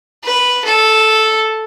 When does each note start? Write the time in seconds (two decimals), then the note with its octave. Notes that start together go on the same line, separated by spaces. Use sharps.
0.24 B4
0.64 A4